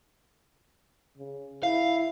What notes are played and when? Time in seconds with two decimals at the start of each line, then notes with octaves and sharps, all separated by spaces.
1.18 C#3
1.63 E4 F5